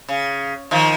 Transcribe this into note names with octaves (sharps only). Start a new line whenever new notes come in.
C#3
D#3 F3